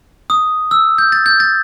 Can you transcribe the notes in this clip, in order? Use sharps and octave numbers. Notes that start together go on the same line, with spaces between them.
D#6
E6
G6
A6
G6
A6